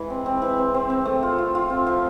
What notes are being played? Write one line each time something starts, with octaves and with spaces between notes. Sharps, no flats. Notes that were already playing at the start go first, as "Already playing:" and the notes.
Already playing: E3 G#3
C4
C4
E3
C4
C4
C4
A3
F4
F4
F4
C4
F3